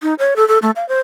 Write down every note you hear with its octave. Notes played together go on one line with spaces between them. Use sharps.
D#4
C#5
A4
A4
A3
F5
C5